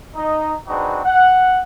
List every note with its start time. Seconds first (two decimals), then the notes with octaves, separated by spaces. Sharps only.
0.15 D#4 D#5
0.68 C4 D4 D#4 F#4 G#4 B4
1.05 F#5